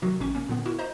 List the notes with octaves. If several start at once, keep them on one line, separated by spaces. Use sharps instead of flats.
C3 D#3 F#3 F#4
A1 C3 C#4 C#6
A#3 C#4
A#2 D3 B3
E4 F#4 A#4
C5 D#5 A#5